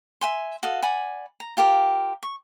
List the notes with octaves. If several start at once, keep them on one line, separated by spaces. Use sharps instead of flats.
E5 G#5 C6
F#4 A4 D#5 F5
D5 F#5 G#5 B5
A#5
F4 G4 A#4 F5
C#6